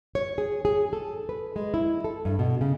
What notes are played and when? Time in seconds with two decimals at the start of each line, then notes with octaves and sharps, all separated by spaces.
0.15 C#5
0.38 G#4
0.65 G#4
0.93 A4
1.29 B4
1.56 G#3
1.74 E4
2.04 A4
2.25 G2
2.39 B2
2.61 C#3